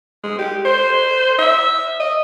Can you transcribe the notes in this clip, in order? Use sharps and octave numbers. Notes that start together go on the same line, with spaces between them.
G#3
G4
C5
E5
D#5